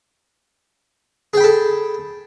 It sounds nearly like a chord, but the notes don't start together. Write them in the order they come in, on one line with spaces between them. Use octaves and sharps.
G#4 G5 B5 A4